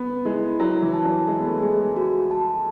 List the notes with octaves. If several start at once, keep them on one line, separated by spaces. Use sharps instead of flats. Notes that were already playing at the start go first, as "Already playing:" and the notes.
Already playing: B3
G#3 E4
F#3 E4
E3
A5
F#3
G#3 G#4
B3
A3
G#3 G#4
G#3
F#4
A5